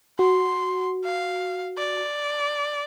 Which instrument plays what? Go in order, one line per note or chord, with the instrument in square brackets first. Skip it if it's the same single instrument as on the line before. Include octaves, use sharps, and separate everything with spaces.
[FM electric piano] F#4 [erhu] C6
[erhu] F5
D5